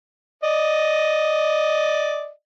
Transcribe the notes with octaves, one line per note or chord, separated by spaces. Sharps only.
D5 D#5